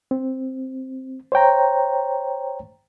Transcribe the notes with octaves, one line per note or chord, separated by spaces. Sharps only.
C4
C5 C#5 G5 A#5